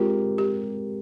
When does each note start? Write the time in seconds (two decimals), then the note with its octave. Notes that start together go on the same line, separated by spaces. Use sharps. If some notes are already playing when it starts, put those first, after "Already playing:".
Already playing: G#3 C4 F4 G4 A#4
0.38 G4